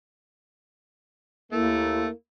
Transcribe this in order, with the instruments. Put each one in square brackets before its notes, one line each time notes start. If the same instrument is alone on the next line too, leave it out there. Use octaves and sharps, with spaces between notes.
[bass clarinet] D#2 [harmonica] A3 [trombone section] A#3 [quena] E4